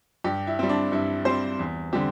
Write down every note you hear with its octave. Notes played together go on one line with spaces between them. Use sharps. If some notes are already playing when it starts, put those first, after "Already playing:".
G2 G4
E4
G3 C4
D4
G2 E4
G3 C4 C5
E2
D3 G3 C4 G4